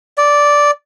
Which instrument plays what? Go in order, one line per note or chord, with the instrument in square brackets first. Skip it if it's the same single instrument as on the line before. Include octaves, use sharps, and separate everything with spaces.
[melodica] D5